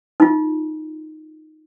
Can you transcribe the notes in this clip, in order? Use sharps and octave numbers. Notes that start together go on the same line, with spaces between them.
D#4 F4